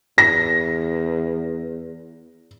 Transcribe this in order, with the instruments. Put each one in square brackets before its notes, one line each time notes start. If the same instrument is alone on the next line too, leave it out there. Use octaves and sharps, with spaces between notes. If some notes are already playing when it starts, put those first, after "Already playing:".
[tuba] E2 [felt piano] A#6